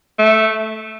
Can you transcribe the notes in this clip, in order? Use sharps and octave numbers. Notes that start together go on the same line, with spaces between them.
A3